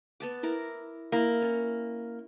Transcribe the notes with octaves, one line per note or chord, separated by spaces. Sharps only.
B3 A5 D6
E4 A#4 D6
A#3 E4
C#4